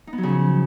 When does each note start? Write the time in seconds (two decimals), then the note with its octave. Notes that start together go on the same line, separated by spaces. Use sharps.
0.07 D#4
0.13 B3
0.18 F#3
0.23 C#3
0.29 F3